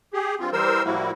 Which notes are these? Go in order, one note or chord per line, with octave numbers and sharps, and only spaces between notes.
G4 G#4
G2 C4 F4
E3 G3 A#4 C5 E6
A2 F3 G3 A#3 E4 F#4